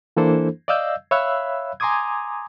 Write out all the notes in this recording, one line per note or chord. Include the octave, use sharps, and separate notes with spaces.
E3 A#3 D4 E4 A4 C5
D5 D#5 F5 E6 G6
C#5 E5 F5 B5 E6 F#6
G#5 A#5 C6 D6 D#6 G#6